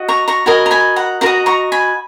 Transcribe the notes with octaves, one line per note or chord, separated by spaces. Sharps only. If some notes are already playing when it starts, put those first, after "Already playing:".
Already playing: F#4 D#5
A#5 C#6
A#5 C#6
F#4 A#4 D#5 G#5 B5
A#5
G#5 B5
F#5 A#5
F#4 A#4 D#5 F#5 A#5
A#5 C#6
G#5 B5